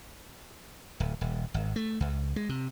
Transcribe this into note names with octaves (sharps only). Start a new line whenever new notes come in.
D1
D#1
G#1
A3
C#2
G#3
C3